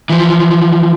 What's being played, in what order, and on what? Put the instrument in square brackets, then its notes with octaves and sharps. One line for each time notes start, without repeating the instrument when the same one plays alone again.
[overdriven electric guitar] E3 F3